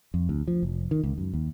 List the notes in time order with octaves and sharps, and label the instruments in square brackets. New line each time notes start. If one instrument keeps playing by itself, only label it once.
[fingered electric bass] F2
D2
F3
F1
D#3
C#2
F#2
D#2